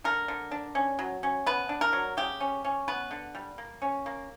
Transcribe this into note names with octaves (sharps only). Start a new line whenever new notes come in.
D3 A#4
D3
D4
C#4
F#3
C#4
B3 B4
D4
A#4
F#3
C#3 G4
C#4
C#4
B3 B4
D3
G3
A#3
C#4
A#3